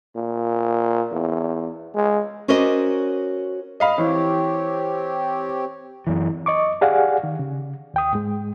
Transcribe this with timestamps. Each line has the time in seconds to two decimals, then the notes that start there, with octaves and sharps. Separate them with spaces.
0.16 A#2
1.11 E2
1.95 G#3
2.48 C#4 F#4 A#4 C5 D5 D#5
3.80 D#5 F5 B5
3.98 E3 C4 G4 C#5
6.07 F#2 E3
6.46 D#5 C#6 D6
6.81 G4 G#4 D5 F5 F#5 G#5
7.23 D#3
7.39 C#3
7.94 D#2 G5 D#6
8.13 G#2 G#3